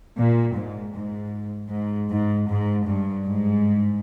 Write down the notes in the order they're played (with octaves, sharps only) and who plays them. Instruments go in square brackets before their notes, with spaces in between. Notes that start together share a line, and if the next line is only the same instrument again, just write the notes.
[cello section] A#2
G#2
G#2
G#2
G#2
G#2
G2
G#2